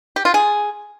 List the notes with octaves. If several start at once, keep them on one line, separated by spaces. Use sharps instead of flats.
G4
F4
G#4